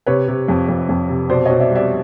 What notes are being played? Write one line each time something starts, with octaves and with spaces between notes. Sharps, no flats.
C3 B4 C#5
C3
F2
F2
F2
C3
B2 C5 D5
B2 C#5 D#5
D5 E5
G3
D5 E5